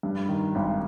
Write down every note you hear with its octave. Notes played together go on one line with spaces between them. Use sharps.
G2
D#3
G#1